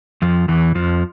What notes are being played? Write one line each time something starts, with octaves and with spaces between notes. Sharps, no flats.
F2 F3
E2 E3
F2 F3